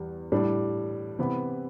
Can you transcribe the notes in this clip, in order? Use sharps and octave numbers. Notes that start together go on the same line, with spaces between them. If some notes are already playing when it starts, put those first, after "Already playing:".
Already playing: E2 G3
A2 G3 D4
C3 E3 B3 E4